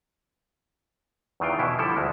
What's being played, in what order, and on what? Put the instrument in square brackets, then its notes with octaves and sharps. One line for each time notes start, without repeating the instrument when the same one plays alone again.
[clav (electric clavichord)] E2 D#3 E3 F4 G5
B2 E3 E4
D3 F3 G3 E4 A4
D2 G#3